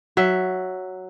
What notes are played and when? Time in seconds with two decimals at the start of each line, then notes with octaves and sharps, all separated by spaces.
0.17 F#3 E5